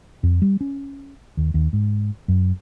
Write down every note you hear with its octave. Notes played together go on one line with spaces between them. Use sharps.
F2
G3
C#4
D#2
D#2
G#2
F#2